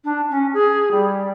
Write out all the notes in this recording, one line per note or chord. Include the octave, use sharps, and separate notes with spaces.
D4
C#4
G#4
G3